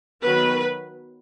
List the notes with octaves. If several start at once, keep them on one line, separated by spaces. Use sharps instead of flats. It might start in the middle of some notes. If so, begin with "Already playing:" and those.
D#3 F#3 B3 B4